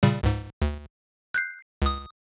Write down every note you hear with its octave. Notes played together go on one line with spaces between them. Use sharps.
A#2 C#3 G3
C#2 G#2
D2
F#6 G6 C7
C#2 D#6